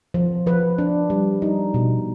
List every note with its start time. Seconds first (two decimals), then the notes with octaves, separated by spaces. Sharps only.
0.14 F3
0.47 F3 B4
0.78 D4
1.10 G3
1.42 D#4
1.74 B2